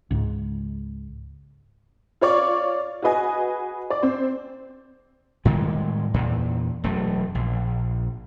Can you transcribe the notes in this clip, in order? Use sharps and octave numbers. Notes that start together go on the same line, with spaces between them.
C#2 G#2
F4 C#5 D5 C#6
F#4 G#4 B4 D#5 G#5
D5
C4 C5
A2 D#3 G3 G#3
E2 A#2
E1 F#2 A3
A#1